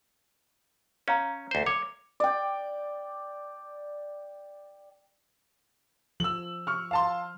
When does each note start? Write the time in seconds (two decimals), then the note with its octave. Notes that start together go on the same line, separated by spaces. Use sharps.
1.08 C#4 C#5 F5 A#5
1.51 D2 C5
1.66 C#5 D6
2.20 D5 G5
6.20 F3 E6 F#7
6.67 C#6 F6
6.91 F5 A5 C6